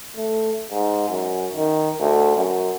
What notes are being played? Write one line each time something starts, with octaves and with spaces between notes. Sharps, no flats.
A3
G#2
F#2
D#3
D2
F#2